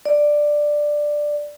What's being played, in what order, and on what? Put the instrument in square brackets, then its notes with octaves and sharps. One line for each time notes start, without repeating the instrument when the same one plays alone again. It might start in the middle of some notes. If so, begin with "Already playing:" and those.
[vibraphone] D5